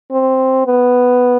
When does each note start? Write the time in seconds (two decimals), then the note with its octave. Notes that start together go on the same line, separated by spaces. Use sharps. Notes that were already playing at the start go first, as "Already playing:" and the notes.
0.11 C4
0.66 B3